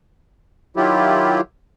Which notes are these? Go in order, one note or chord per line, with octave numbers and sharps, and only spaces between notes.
D#3 F#3 E4 F4 G4